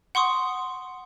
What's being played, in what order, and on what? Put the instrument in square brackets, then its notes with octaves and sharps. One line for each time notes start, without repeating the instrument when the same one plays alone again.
[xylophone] F#5 C6 C#6 D#6